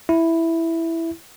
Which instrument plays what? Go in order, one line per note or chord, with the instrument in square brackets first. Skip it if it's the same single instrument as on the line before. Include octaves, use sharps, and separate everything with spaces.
[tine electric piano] E4